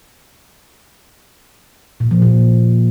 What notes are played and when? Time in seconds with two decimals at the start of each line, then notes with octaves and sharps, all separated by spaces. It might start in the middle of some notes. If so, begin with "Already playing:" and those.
2.00 A#2
2.11 F3
2.22 A#2